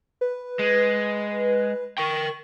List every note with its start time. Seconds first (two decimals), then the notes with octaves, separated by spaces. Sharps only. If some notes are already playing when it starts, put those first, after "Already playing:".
0.21 B4
0.59 G#3
1.98 A#4 G5 C#6